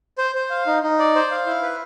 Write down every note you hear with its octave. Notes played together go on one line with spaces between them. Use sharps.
C5
C5
F5
D#4
D#4
D5
C5
F5
E4
B4